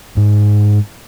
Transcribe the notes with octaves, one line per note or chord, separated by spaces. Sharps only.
G#2